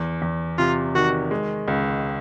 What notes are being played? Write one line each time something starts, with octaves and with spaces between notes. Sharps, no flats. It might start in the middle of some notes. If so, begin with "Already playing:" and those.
Already playing: E2
E2
C3 F4
D#3 F#4
G#3
C#2